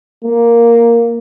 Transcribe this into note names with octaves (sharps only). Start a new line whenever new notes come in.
A#3